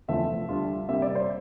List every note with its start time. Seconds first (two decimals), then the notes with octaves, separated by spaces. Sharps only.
0.08 E2 C3 F3 A3 C4 E5
0.49 D2 D3 G3 D4 F4
0.89 C3 G3 A#3 E5
1.02 D5
1.15 C5